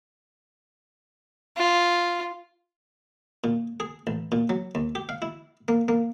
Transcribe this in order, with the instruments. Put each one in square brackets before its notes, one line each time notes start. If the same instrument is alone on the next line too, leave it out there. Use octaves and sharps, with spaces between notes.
[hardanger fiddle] F4
[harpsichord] A#2
G#4
A1
A#2
F#3
D#2
G4
F5
E4
A#3
A#3